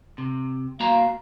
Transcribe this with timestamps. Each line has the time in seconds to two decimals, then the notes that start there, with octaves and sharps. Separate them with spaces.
0.18 C3
0.80 A#3 F#4 F5 A#5